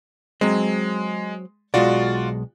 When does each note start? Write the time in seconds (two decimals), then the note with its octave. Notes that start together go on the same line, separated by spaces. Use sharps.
0.41 F#3 G#3 C4
1.74 B1 G#3 F4 F#4 D5